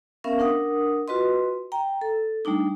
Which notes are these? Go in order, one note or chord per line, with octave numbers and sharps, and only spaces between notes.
B3 C#4 A#4 E5 F5
D4 A#4 F#5 D#6
F4 F#4 B4 D#5 C6
G5 A#5
A4
G3 A3 D4 D#4